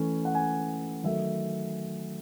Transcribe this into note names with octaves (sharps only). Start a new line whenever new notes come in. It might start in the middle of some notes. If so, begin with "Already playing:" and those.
Already playing: E3 A3 C#4
F#5
G#5
D#3 F#3 A3 E5